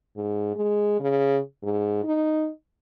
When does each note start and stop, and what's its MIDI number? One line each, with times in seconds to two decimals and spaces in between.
0.16 0.52 44
0.56 0.99 56
0.99 1.39 49
1.63 2.00 44
2.04 2.49 63